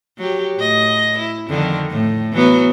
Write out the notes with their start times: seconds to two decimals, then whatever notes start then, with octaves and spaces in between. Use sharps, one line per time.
0.18 F#3 G4
0.57 A2 D#5
1.18 E4
1.49 F2 D3 D#3
1.90 A2
2.32 E3 F#3 B3